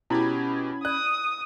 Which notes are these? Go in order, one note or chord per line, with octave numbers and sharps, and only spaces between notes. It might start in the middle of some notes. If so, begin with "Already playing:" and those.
B2 C#4 E4 G4 B5 G#6
D5 D#6 F#6